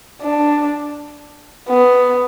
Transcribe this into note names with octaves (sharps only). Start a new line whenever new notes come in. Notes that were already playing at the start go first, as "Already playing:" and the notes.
D4
B3